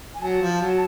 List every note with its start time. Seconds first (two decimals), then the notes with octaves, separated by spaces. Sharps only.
0.14 G#5
0.22 F#3 A5
0.41 F3
0.61 F#3